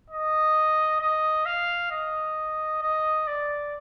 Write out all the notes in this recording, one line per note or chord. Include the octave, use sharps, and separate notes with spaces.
D#5
D#5
F5
D#5
D#5
D5